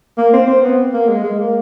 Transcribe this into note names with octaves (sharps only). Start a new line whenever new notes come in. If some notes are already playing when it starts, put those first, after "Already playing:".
A#3
C4
C4
B3
A#3
G#3
G#3
A#3